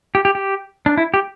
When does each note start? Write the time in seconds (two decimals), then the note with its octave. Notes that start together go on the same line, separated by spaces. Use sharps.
0.15 G4
0.25 G4
0.35 G4
0.86 D4
0.98 E4
1.14 G4